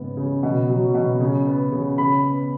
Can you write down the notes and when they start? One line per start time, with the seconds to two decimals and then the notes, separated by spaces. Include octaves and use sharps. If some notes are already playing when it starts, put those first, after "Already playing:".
Already playing: G#2 C#3 B3
0.17 C#3
0.43 B2
0.69 F#3
0.94 B2
1.20 C#3
1.47 B3
1.72 C#3
1.98 C#3 B5
2.24 B3